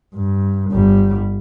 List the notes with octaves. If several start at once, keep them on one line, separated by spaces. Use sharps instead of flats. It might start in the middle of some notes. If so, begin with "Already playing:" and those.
G2
G1 G3